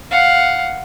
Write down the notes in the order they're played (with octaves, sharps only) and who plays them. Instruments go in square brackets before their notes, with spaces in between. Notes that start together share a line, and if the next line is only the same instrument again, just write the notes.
[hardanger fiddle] F5 F#5